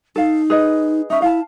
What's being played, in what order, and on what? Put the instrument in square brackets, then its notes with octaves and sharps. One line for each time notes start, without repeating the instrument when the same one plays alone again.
[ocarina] D#4 [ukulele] A4 F5
[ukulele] G#4 B4 D#5
[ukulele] C#4 D#4 [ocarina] E5
[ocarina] E4 [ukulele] F5 A5